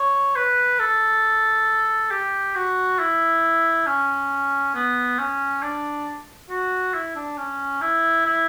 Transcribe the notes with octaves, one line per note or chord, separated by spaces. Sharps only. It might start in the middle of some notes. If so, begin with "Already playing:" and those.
Already playing: C#5
B4
A4
G4
F#4
E4
C#4
B3
C#4
D4
F#4
E4
D4
C#4
E4
E4